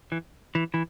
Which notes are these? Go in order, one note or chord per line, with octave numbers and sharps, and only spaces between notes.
E3
E3
E3